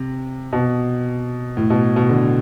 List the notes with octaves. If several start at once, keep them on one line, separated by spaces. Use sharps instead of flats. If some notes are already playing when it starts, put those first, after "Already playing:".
Already playing: C3
B2
A2
B2
B2
D3